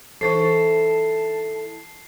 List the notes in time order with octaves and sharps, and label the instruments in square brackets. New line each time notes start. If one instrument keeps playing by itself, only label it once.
[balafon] E3 C5 C#6 [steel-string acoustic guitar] D#4 E4 A4 [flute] A5 [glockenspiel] C7